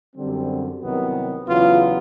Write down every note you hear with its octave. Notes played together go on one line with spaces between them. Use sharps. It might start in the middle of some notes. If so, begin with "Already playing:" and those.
F#2 D3 G3 C4
C2 C3 D#3 F#3 B3
E2 C#3 F#3 B3 F4